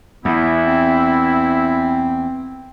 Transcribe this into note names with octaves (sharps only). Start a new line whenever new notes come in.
E2 B3 E4
C4